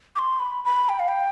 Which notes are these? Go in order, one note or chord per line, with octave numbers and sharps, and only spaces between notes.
D6
C6
B5
B5
G5
F5
G5